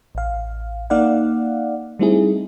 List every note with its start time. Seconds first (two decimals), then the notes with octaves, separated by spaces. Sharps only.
0.15 A1 F5
0.90 A#3 D#4 D5 F5 F#5
1.99 G3 A3 C4 D#4 E4 G#4